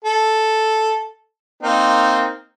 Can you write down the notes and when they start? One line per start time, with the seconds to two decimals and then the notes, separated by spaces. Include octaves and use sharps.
0.05 A4
1.63 A#3 C4 D#4